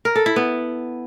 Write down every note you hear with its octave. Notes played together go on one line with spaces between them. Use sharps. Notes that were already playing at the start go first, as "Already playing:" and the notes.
A#4
A4
E4
B3